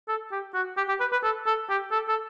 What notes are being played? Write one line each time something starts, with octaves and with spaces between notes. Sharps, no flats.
A4
G4
F#4
G4
G4
B4
B4
A4
A4
G4
A4
A4